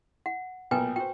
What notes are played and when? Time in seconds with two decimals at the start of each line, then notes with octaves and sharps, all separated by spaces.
0.26 F#5
0.71 B1 A#2 B4 G5 G#5
0.96 F#4 C5 G5